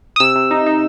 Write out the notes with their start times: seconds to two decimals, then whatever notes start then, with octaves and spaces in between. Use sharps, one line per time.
0.16 D#6
0.20 C3 E6
0.36 C3
0.51 D#4
0.66 D#4